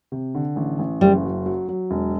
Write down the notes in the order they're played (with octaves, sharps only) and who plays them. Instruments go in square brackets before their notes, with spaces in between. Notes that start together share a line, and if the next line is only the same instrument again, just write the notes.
[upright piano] C3
D3
A1
A1
[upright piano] F#1 [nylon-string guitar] G3
[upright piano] F#3
F#3
F#3
E1